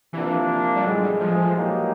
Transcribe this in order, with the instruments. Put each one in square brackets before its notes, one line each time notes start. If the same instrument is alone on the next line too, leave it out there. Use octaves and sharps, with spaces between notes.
[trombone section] C3 F3 A#3 D4 F4 [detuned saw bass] E3
[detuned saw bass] G3
[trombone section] A2 E3 G#3 [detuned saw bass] F#3
[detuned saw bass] G3
F3
[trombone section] A#2 F#3 A#3 D#4 G4